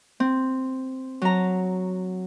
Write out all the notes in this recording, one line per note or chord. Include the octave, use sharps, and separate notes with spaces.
C4
F#3 A#5